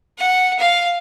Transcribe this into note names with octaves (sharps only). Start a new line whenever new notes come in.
F#5
F5